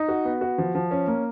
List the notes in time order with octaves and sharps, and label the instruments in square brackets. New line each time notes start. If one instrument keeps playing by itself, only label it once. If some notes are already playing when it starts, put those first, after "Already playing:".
Already playing: [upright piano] D#4
F#4
B3
F#4
F3
F3
C#4
A#3